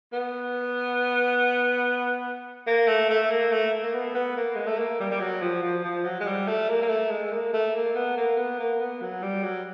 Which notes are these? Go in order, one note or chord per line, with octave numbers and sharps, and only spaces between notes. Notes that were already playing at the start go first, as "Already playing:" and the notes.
B3
A#3
A3
A3
A#3
A3
A#3
B3
B3
A#3
G#3
A3
A#3
G3
G3
F#3
F3
F3
F3
F#3
G#3
G3
A3
A#3
A#3
A3
G#3
A#3
A3
A#3
B3
A#3
B3
A#3
B3
F#3
G3
F#3